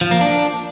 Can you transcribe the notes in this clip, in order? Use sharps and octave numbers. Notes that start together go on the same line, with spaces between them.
F3
A#3
D4